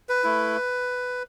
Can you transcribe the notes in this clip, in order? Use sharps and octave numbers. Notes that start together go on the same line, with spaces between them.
B4
A3 E4